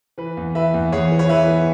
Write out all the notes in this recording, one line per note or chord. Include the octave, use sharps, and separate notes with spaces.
E3 B4
E2
E3 B4 E5
E2
E2 G#4 C#5
E3
C#5
E3 B4 E5
E3